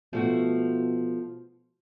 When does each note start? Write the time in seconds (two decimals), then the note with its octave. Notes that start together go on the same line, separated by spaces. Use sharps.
0.13 B2 F3 A3 F#4